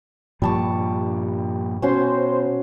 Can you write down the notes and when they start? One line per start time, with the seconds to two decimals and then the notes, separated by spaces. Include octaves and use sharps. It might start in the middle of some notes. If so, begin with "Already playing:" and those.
0.42 G2 A#2 F3 G3 A5 C#6
1.82 B2 C#4 F#4 C5 C6